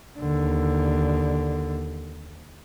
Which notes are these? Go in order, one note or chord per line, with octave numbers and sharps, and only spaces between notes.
D#2 D3